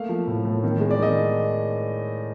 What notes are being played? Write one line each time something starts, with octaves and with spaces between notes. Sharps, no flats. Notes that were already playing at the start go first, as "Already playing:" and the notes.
Already playing: A3 A#3 F5
F3
A2
A2
D#3
G#3
D5
D#3 D#5